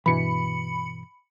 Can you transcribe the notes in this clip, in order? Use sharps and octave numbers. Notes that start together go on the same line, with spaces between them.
G2 B2 E3 B5 C#7